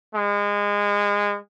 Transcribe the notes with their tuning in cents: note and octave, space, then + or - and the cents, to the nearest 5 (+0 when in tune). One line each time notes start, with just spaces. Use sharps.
G#3 -25